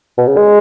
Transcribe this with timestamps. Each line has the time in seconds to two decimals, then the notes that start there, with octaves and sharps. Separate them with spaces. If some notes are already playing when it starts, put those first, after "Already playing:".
0.18 B2
0.27 C#3
0.37 G#3